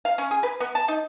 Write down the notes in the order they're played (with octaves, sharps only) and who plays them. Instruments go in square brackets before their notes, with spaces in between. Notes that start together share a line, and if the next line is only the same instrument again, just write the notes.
[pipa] F5
C#4
G#4
B4
B3
A5
D#4